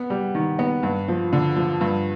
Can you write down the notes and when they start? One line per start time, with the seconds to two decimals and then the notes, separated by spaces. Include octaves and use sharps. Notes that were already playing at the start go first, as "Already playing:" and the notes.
Already playing: B3
0.10 G3
0.35 D#3
0.59 B3
0.83 G2
1.08 F3
1.33 D3
1.56 F3
1.81 G2